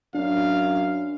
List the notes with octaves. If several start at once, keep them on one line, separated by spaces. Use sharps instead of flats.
F#2 D4 F5